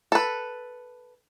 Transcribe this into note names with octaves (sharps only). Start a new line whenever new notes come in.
A4 B4